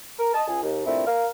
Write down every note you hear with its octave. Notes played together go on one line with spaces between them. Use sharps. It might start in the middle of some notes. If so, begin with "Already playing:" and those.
A#4
D#5 A5
C#2 G#4
D#2
G2 A#2 D3 A3 C4 E4
A#4 F5